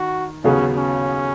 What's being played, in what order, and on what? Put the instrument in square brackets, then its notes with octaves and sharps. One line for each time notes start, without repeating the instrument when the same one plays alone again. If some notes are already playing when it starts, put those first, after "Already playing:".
Already playing: [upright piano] D#3 [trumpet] F#4
[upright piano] D#2 C#3 F#3 B3 G#4 [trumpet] C#4
[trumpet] C#4